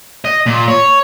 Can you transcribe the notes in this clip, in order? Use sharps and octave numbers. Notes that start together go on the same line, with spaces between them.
D#5
A#2
C#5